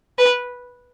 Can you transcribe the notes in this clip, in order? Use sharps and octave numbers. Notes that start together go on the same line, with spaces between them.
B4